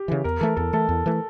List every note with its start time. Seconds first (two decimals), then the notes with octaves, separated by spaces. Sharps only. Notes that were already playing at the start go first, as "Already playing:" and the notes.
Already playing: G4
0.08 C#3 E3
0.24 E2 A#4
0.41 E3 A3 A4
0.57 E2 A4
0.73 E3 A3 A4
0.89 E2
1.06 E3 A3